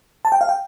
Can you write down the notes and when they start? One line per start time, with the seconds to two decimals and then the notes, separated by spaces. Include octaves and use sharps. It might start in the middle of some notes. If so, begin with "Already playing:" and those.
0.25 A5
0.32 G5
0.41 F5
0.49 G5